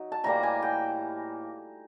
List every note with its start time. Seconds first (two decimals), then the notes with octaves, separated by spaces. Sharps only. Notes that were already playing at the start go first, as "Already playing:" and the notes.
Already playing: F#3 D#4
0.12 A5
0.24 A2 E3 G3 A#3 A#5
0.43 G#5
0.62 G5